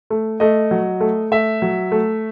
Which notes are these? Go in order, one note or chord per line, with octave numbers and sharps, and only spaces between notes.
A3
A3 D#5
F#3
A3
A3 E5
F#3
A3